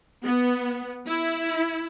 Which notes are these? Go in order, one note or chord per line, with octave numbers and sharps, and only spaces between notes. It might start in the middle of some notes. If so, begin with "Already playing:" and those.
B3
E4